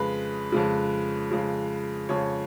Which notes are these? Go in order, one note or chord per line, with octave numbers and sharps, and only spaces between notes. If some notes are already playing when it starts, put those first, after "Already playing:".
Already playing: F2 C#3 G#3 B4
F2 C#3 G#3
F2 C#3 G#3
F2 C#3 G#3 C#5